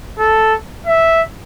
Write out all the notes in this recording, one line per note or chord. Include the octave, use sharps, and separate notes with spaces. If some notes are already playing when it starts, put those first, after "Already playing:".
A4
E5